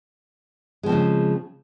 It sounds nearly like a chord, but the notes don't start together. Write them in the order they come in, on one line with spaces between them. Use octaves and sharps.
G#3 F3 C4 C#3